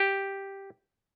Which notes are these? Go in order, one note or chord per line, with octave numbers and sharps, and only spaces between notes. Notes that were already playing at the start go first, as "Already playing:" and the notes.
Already playing: G4